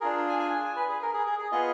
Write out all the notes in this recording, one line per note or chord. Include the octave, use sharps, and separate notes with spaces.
D4 F4 G#4 A#4
G#5
G#5
G#5
G#5
B4
G#4
A#4
G#4
G#4
G#4
B3 F4 G#4 D#5